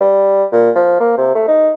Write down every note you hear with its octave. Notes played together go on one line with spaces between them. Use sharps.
G3
A#2
F3
A#3
C3
A3
D#4